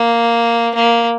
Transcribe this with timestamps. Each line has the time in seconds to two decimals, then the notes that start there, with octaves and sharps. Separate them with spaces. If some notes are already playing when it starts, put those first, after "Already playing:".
Already playing: A#3
0.75 A#3